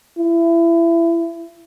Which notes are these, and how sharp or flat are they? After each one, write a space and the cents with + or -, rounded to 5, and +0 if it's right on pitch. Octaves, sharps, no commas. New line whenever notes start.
E4 +25